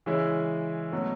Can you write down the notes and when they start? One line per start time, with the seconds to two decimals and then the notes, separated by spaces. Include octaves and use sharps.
0.06 C#3 E3 G#3 C#4 E4
0.92 B2 F#3 A3 C#4